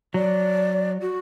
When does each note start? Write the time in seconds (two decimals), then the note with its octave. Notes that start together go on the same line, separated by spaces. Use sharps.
0.14 F#3 D5
1.01 F#4